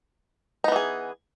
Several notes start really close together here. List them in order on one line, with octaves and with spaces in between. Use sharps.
D#4 B3 E3 G#4